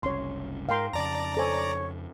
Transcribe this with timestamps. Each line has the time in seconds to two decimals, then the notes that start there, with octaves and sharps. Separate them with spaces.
0.03 F#1 C2 C#4 C#5 C6
0.69 G#2 A#4 F5 G5 C6
0.93 F2 C#3 D5 A5 A#5
1.37 A4 C5 C#5 G#5